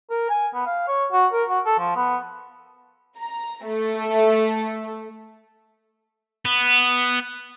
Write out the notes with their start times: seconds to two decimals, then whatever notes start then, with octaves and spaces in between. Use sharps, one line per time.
0.10 A#4
0.30 G#5
0.55 B3
0.66 F5
0.87 C#5
1.12 F#4
1.32 A#4
1.49 F#4
1.66 A4
1.79 F3
1.96 B3
3.18 A#5
3.67 A3
6.45 B3